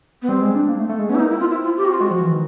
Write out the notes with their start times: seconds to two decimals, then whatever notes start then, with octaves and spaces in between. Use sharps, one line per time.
0.22 B3
0.29 G3 C4
0.42 G#3
0.55 D4
0.69 A#3
0.79 A3
0.89 A3
0.99 G#3
1.09 B3 C#4
1.15 E4
1.20 D#4
1.23 A#3
1.30 E4
1.36 C4 F4
1.51 E4
1.64 F4
1.77 G4
1.85 F#4
1.90 C4 F4
2.00 G#3 F#4
2.11 F3
2.21 E3
2.31 D#3